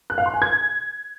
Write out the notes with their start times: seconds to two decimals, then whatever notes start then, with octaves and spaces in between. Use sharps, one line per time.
0.10 F#6
0.18 F5
0.26 C6
0.34 G#5
0.42 G#6